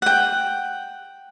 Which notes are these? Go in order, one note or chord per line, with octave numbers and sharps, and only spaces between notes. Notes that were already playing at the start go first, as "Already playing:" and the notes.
F#5 G5